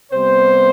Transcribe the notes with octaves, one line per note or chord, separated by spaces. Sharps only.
C3 G3 B3 C5